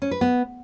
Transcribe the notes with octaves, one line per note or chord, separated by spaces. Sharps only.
C#4
B4
B3